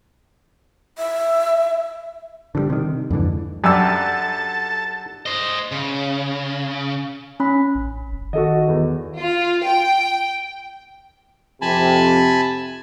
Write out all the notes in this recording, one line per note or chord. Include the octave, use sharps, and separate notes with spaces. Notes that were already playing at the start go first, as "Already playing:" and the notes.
E5
D3 E3 G3
C3 D#3
F2 G#2 D3 E3
F#2 G3 D4 A4 A5 E6
C5 D#5
C#3
C#4 B5
A1
F#1
D#3 F#4 A4 D#5
E2
F4
G5
F2 C3 G#5 A5 B5